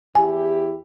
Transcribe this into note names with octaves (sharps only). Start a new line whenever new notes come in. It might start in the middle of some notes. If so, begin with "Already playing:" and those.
E2 E4 G4 G#5